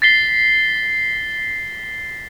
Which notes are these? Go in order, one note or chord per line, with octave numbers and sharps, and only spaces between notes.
A6 B6 C7 G7